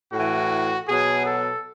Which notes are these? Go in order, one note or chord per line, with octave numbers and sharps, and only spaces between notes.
A2 E3 F#4
B2 F#3 G#4
A4